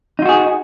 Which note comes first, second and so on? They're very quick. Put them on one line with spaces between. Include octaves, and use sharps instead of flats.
D#4 F4 F#4 G#4